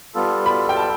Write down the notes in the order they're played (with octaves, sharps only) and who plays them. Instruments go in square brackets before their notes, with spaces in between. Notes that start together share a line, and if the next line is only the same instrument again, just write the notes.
[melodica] G3 B3 F4 A4
[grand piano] B5
G5
A5